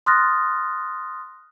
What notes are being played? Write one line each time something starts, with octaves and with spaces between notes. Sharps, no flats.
C6 D#6 F6 F#6 A6 A#6